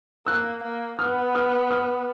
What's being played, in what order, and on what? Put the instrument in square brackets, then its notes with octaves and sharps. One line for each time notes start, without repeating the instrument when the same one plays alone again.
[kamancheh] A#3 [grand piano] E6 F#6
[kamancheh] A#3
[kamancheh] B3 [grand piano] D#6 F6
[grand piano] D#6 F6
D#6 F6